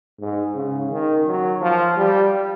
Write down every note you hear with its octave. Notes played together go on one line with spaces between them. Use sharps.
G#2
C#3
D#3
F#3
F3
G3